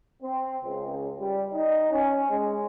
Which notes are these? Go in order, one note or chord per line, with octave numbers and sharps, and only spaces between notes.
C4
C#2
G3
D#4
C#4
G#3